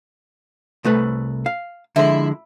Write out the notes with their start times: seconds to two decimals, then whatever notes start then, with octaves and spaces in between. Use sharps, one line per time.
0.84 C2 A3 B4
1.46 F5
1.96 D3 F3 G#3 E4